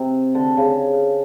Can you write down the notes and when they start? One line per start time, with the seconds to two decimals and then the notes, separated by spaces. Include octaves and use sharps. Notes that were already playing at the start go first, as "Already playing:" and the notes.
Already playing: C3
0.35 D3
0.57 C#3